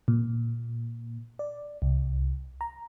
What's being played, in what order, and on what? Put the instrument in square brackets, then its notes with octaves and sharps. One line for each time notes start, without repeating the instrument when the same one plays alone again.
[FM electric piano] A#2
D5
C2
A#5